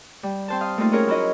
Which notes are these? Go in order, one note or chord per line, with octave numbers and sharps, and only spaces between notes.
G3
C4 C5 A5
F5 D#6
A3 A#3 C4 D#4 F4
C#4 G#4 A#4 C#5
F#3 E4 F#4 D#5